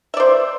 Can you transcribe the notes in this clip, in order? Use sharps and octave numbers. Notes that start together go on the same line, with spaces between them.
C5 D5 E5